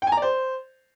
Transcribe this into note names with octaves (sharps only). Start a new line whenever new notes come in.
G5
G#5
A#5
D5
C5